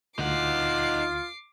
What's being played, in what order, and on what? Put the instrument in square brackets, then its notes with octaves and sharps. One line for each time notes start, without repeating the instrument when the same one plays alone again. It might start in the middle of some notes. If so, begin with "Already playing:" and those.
[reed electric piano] D2 [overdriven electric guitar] D#4 F#5 [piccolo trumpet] F4 [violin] D6 C7